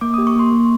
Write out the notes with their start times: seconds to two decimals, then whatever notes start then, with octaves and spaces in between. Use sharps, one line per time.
0.01 A#3 D6
0.14 D#6
0.18 G4
0.27 C#6
0.36 A#3 C6
0.52 A#3